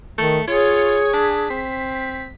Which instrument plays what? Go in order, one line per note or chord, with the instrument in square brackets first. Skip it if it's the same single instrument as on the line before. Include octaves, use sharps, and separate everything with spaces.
[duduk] D#3 [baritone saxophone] A3
[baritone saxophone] F4 [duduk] G#4 [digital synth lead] C#5
[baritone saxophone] D4 [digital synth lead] B6
[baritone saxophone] C4